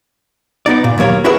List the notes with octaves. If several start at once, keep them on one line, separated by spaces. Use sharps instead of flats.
B3 D#4 D5
A#2
D#2 F#3 A#3 C#5
E4 F#4 G#4 A#4 B4 E5